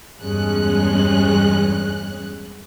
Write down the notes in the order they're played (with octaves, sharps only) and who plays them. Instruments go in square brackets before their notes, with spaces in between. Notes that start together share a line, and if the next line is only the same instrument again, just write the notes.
[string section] E2 G2 G#3 C#4 F#6